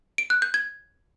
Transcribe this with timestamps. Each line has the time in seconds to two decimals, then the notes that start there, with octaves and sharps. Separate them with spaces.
0.18 D7
0.30 F#6
0.42 G6
0.54 G#6